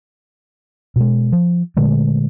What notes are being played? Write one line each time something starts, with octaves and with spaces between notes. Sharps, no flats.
B2 G#3
F3
A#2 D3 G#3 A3